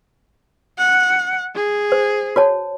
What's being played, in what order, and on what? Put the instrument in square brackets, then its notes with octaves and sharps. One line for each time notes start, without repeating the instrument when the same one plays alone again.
[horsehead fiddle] F#5
G#4
[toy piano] C5
F#4 C#5 A5